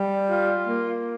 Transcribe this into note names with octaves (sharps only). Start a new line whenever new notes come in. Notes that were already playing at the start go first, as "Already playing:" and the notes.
Already playing: G3
F4
A#3